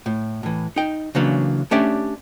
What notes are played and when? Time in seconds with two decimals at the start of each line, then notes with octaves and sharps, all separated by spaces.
0.06 A2
0.43 A2 E3
0.76 D#4 G5
1.15 C#3 E3 F#3 A#3 C#4 D4
1.71 A3 C#4 D4 G4 D5 E5